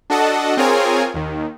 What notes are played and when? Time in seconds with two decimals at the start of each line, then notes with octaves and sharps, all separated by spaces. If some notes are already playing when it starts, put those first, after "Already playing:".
0.10 D4 F#4 A4 D#5 F#5 A5
0.57 C4 F4 G#4 A#4 C#5 G#5
1.14 D#2 D#3